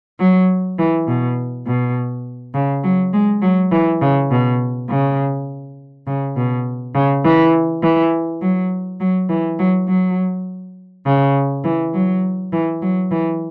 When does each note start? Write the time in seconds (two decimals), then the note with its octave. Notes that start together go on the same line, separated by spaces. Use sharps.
0.19 F#3
0.78 E3
1.07 B2
1.66 B2
2.54 C#3
2.84 F#3
3.13 G#3
3.42 F#3
3.72 E3
4.01 C#3
4.31 B2
4.89 C#3
6.07 C#3
6.36 B2
6.95 C#3
7.24 E3
7.83 E3
8.41 F#3
9.00 F#3
9.29 E3
9.59 F#3
9.88 F#3
11.06 C#3
11.64 E3
11.93 F#3
12.52 E3
12.82 F#3
13.11 E3